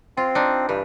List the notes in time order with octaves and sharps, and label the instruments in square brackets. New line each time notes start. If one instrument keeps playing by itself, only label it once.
[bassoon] C4 [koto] F4
[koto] D4 D#4
[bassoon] G2 [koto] E3